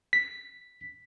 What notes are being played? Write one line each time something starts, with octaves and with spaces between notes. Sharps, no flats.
B6